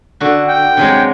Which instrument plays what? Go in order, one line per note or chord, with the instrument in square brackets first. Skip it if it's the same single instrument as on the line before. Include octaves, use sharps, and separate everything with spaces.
[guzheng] D3 F#4
[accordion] G5
[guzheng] C3 F#3 G#3